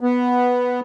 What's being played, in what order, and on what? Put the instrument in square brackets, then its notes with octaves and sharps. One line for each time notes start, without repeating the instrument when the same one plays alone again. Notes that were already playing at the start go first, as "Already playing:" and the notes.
[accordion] B3